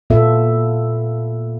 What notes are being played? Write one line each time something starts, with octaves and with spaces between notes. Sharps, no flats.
A#2 B3 F4 A4 E5